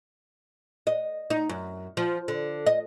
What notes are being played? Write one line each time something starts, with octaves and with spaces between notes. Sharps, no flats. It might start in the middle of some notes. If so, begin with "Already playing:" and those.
D#5
D#4
F#2
F3
D3
D#5